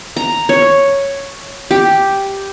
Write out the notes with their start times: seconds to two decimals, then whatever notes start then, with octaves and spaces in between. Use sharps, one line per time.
0.17 A#5
0.49 C#5
1.71 G4